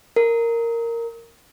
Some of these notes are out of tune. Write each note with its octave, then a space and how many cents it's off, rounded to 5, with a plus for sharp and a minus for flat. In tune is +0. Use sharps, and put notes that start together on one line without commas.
A#4 -10